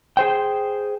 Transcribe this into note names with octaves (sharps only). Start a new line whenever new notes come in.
G#4 C5 G5